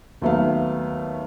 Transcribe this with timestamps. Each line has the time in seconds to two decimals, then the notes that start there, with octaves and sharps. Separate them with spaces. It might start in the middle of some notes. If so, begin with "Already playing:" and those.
0.22 D#2 F#3 A3 B3 F5